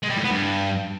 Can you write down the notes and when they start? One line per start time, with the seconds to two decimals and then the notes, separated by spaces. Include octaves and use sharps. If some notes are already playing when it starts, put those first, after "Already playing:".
0.03 G#3
0.10 G3
0.17 A2
0.24 B3
0.31 G2